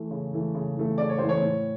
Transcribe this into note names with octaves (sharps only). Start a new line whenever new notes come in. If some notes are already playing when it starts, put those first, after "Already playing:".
Already playing: E3 A3
C#3
E3 A3
C#3
E3 A3
C#3 D5
C#5
E3 A3 C5
C#5
A2